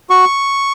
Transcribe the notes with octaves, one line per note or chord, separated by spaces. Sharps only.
F#4 C#6